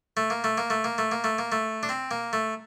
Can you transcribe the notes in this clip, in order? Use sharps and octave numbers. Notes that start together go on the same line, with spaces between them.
A3
A#3
A3
A#3
A3
A#3
A3
A#3
A3
A#3
A3
D4
C4
A#3
A3